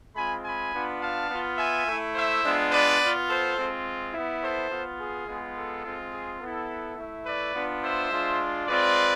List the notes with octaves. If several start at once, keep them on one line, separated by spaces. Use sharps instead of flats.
G#3 C4 F4 G#5 B5
G#5 B5
B3 D4 F4
F5 A5
B3 F4
E5 G#5
A3 E4
C5 E5
G#3 B3 D4 F4
B4 D5
B3 F4
A4 C5
G#3 C4 F4
B3 E4
A4 C5
B3 F4
G#4
G#3 B3 F4
A4
G#3 C4 F4
G#4
B3 E4 A4
A3 E4
B4 D5
B3 D4 F4
C5 E5
G#3 D4 F4
G#3 C4 F4 B4 D5